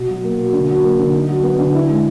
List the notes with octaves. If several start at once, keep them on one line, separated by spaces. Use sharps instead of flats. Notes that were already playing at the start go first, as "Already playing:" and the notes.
Already playing: B2
F#3
A#3
B2
D3
F#3
A#3
D3
D#4
F#3
B3
D3
E4
G#3